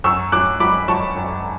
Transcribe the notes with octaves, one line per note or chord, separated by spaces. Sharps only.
F#2 C#6 E6
F#3 D6 F#6
F#3 B5 D6
F#3 A5 C#6
F#2